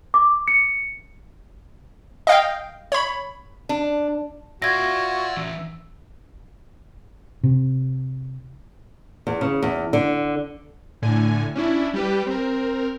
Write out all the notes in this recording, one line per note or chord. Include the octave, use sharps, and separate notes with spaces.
D6
C#7
D#5 F5 G5
C#5 B5
D4
F4 F#4 D5 E5 F5 G#6 A#6
E3 C#4 E5
C3
E2
C#3
E2
D3
A2 D3 G#5
C#4 D4 E4
G3 G4 B4
C4 A#4